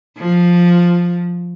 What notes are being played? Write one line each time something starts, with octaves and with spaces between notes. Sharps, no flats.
F3